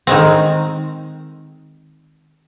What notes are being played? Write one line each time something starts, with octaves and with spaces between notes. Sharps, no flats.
D#3 G#3 C4